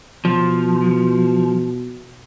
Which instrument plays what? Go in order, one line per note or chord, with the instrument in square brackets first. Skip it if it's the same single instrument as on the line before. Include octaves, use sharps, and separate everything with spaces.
[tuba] B2 [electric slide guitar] F3